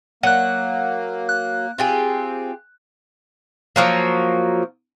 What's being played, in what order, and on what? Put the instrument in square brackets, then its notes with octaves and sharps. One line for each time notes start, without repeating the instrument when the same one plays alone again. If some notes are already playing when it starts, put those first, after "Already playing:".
[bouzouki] F#3 [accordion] A#3 [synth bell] F#5 F#6
[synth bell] F#6
[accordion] C4 [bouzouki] F4 G4 G#4
[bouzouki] F3 F#3 A#3